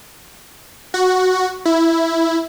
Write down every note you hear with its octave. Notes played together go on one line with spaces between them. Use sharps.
F#4
E4